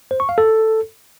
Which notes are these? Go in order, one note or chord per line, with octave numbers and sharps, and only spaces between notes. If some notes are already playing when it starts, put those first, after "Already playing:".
C5
C#6
F5
A4